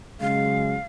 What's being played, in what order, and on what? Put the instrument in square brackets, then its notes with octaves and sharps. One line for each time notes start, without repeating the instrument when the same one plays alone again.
[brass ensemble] C#3 F#3 G#3 [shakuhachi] F5